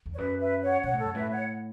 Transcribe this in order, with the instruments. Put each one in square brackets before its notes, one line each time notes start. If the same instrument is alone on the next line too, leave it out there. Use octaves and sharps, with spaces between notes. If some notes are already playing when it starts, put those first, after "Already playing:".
[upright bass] E2
[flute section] C#5
[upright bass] F#2 [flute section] B4
[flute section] B4 E5
C#5 F#5
[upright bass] B2 [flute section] C#5 F#5
[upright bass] A2
[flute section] A4 C#5
[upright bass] F#2
[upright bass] A2 [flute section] B4 E5
[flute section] C#5 F#5